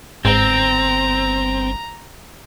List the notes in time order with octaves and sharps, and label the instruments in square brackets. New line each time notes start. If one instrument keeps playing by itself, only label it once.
[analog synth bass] G1 [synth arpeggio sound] G#2 [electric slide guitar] C4 [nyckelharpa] A#5